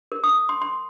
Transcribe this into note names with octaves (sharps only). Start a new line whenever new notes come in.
A#4
D#6
C6
C6